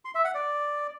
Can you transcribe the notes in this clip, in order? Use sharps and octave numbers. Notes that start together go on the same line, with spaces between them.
C6
E5
F#5
D5